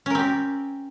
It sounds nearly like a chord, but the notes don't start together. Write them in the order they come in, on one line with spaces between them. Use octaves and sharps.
C#4 A#4 C4 G4